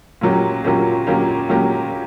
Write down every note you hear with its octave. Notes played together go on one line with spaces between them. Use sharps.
A#2 F#3 A#3 C#4 G4
A#2 F#3 A#3 C#4 G4
A#2 F#3 A#3 C#4 G4
A#2 F#3 A#3 C#4 G4